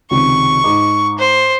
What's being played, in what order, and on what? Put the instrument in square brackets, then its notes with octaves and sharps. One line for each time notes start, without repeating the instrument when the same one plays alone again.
[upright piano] C#2 C3 D#3 [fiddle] C#6
[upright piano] G#2 D#4 D6
[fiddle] C5